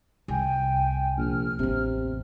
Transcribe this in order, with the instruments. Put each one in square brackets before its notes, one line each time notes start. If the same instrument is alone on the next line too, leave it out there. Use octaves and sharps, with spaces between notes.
[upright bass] C2 [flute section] G5 G#5
[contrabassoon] A#1 [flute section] F6
[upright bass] A1 E2 [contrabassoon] C3